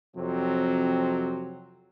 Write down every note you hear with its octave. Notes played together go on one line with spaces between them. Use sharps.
F2 C3 F#3 C4